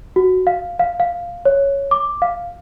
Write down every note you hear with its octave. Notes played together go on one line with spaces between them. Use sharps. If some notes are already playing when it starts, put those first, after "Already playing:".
F#4
F5
F5
F5
C#5
D6
F5